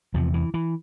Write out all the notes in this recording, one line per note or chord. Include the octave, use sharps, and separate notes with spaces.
E2 C3 F3
E3
E3